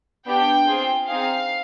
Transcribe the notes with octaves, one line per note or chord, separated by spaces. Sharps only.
B3 D4 G4 G5
C4 F4 G#4
C4 D#4 G#4 F5